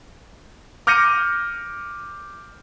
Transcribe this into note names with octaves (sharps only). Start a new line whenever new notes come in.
D6 F6 G6 A#6 C#7 D#7